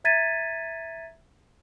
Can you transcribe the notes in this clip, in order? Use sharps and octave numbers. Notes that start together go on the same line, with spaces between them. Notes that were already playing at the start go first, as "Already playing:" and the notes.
E5 A#5 G#6 A6 B6 D#7